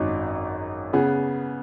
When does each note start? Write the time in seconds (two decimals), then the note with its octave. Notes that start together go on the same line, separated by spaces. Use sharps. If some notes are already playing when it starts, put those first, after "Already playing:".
Already playing: G#1 F#2 F#3 D#4
0.93 C#3 B3 G#4 B4